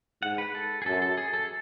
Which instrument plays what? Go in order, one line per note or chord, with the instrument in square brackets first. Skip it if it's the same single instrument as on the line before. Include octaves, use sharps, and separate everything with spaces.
[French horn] G#2 [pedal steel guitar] F#5
[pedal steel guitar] B4
A4
G#4
[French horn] F#2 [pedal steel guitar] A4
[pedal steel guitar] A4
G#4
A4